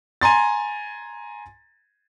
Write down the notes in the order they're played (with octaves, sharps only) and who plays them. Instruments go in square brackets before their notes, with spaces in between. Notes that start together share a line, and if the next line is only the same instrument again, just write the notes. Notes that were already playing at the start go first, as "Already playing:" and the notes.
[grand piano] G#5 A#5 C6 A6